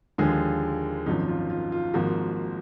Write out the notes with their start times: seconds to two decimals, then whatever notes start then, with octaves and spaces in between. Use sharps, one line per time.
0.18 D#2 D3 F3 G#3 G#4
1.06 G#1 F#2 F3 D#4
1.28 F4
1.50 F4
1.72 F4
1.94 G#1 G#2 F3 A#3 F#4